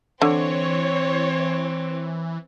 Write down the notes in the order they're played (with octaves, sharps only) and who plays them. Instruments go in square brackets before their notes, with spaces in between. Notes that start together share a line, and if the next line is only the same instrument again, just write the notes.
[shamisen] D3 [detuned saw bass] E3 [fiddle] C4 [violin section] C#5